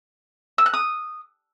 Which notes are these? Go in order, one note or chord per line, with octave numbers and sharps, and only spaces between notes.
E6
F#6
D#6